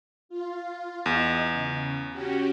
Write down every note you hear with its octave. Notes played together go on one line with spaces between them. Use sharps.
F4
E2 D#5
C#3
C#4 F#4 G4